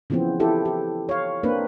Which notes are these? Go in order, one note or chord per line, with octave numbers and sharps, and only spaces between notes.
C#3 E3 F3 B3 C4
E4 G4 A4
G4
C#5 F5
A#3 C4 D4 B4